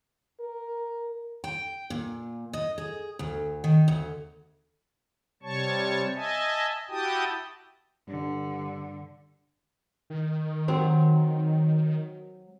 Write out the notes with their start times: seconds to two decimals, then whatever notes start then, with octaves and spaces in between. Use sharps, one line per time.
0.40 A#4
1.44 G5
1.90 A#2
2.53 D#5
2.78 G#4
3.19 D2
3.64 D#3
3.88 D2
5.43 C3 G3 C#5 A5 C#6
6.15 D#5 E5 G#5 A5
6.89 E4 F#4 G4 G5 A5 D#6
8.08 G2 D3
10.10 D#3
10.68 F#3 C4